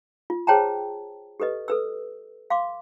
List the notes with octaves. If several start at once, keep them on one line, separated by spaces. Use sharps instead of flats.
F4
G#4 C5 C#5 G5 A5 A#5
G4 A4 B4 D#5
A4 B4 E6
F5 C6 D6